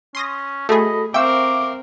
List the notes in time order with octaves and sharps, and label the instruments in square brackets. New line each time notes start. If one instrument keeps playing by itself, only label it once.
[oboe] C#4 [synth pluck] C6 D#6 A#6
[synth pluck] A3 G#4 [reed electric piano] F#4 A4 B5 [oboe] D#5
[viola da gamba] C4 A#4 [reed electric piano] E5 F5 C#6 [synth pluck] G5 E6 [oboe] D6